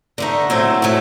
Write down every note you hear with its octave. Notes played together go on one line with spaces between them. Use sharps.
D3 A3 D#4
A2 F#3 A3 C4
A2 F#3 A3